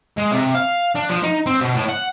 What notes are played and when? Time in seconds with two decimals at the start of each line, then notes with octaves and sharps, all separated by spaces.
0.17 G#3
0.31 C3
0.55 F5
0.95 D4
1.09 F3
1.23 D#4
1.46 C4
1.61 B2
1.75 A2
1.89 F#5